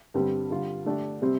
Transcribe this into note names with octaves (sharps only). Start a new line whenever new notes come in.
G2 D3 G3 C4 G4
D3 G3 F4
D3 A3 D4 G4
C3 G3 C4